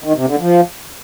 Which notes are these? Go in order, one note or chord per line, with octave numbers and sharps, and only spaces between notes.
D#3
C3
D3
F3